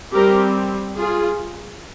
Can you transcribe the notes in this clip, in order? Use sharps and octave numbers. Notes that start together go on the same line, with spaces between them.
G3 C4 G4 A#4
F4 G#4